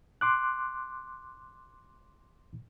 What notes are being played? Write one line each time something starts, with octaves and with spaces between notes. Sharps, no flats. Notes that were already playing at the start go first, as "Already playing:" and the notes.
C6 D6 F#6